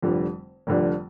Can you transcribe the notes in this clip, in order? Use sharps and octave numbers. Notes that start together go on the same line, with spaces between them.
F1 F2 D3 G3
F1 F2 D3 G3